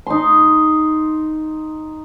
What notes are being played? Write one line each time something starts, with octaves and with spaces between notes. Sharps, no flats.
D#4 C6